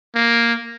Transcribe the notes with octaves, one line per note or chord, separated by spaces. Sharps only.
A#3